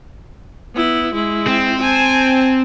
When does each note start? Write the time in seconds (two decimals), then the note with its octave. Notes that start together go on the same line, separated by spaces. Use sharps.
0.75 B3 E4
1.14 G#3 E4
1.47 C4
1.81 G#5 A5